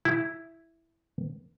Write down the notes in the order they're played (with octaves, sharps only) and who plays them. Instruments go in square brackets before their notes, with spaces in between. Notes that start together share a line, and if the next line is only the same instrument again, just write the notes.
[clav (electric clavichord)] E4